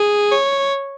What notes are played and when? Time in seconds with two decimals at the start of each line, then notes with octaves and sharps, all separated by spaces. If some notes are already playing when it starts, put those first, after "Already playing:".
Already playing: G#4
0.32 C#5